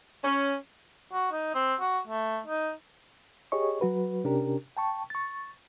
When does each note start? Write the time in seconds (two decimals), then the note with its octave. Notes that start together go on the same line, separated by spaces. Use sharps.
0.24 C#4
1.13 F#4
1.32 D#4
1.55 C4
1.80 F#4
2.07 A3
2.47 D#4
3.52 G4 G#4 C#5 D#5 C#6
3.81 F#3 F#4 B4
4.24 C3 C#4 D4 G4 A#4
4.77 G5 A5 C#6
5.10 C#6 A6